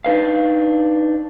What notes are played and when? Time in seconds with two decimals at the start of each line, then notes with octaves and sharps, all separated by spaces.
0.04 D4 D#4 B4 F5